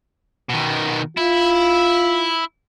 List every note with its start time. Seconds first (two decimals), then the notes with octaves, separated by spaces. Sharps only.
0.49 B2 D#3
1.17 E4 F4